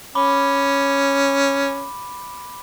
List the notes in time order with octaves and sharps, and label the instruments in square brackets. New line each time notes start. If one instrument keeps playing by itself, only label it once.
[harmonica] C#4 [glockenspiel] B5 D6 G7